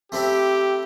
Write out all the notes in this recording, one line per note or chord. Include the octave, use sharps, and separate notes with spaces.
A3 C4 E4 G4